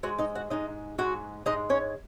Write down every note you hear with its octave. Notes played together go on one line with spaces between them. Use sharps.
G#2 G#3 F#4 F#5
D#4 D#5
F#4 F#5
G#2 G#3 D#4 D#5
G#2 G#3 F#4 F#5
G#2 G#3 D#4 D#5
C#4 C#5